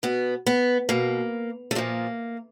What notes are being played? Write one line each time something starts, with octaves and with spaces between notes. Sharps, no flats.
B2 B3
B3
B2 A#3
A3
A#2 F3 A#3